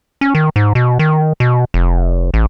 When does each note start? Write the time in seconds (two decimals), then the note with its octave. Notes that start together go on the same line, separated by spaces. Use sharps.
0.21 C#4
0.35 D#3
0.56 G#2
0.75 B2
0.99 D#3
1.40 B2
1.74 F1
2.34 A1